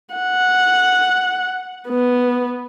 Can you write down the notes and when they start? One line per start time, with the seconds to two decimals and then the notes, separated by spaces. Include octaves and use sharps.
0.14 F#5
1.88 B3